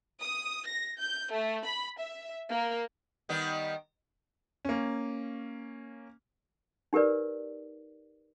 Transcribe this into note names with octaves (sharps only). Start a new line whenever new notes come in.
D#6
A#6
G6
A3
B5
E5
A#3
D#3 G3 B3
A#3 C#4
D#4 G4 A#4 B4 D5